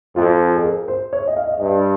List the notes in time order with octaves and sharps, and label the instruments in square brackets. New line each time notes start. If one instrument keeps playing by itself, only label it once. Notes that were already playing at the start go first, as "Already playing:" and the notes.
[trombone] F2 [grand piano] F4
[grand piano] G#4
A#4
C5
C#5
D#5
F5
D#5
[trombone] G2 [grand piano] D#5